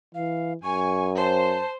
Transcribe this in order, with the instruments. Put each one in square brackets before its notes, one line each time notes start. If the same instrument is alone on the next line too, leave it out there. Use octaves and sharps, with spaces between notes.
[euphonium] E3 [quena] F5
[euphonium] F#2 [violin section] G#5 [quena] C#6
[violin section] C5 [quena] A5